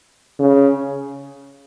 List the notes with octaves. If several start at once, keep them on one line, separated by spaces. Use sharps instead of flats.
C#3